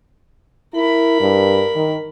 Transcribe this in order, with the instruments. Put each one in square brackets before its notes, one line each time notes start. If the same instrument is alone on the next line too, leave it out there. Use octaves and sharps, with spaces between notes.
[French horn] E4 [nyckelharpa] A#4 B5
[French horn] G2
D#3